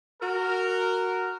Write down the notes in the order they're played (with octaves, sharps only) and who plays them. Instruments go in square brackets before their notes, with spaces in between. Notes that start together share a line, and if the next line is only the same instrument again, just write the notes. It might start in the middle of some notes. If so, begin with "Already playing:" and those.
[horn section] F#4 A#4